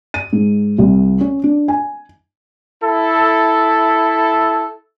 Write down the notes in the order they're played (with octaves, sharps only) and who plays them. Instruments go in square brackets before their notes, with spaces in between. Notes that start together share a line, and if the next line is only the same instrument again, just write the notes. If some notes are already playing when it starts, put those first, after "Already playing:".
[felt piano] D#7
G#2
C2
C#4
D4
G#5
[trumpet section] E4 A4